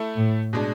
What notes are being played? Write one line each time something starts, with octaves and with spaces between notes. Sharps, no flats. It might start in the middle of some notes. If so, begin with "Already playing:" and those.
Already playing: A3 E4 A4
A2
B2 G#3 D4